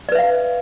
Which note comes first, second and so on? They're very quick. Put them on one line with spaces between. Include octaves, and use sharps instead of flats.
D5 B4 E5 F5